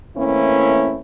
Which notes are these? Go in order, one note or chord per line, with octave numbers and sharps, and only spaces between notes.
E3 A3 A#3 C4 C#4 E4